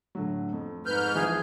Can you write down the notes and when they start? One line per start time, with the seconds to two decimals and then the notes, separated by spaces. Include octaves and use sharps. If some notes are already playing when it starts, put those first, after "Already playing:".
0.15 A2 D3 F#3
0.53 F2
0.86 G#2 B4 F6 G6
1.15 E3 F3 G#4